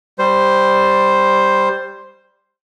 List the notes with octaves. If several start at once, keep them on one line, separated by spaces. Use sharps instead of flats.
G3 C5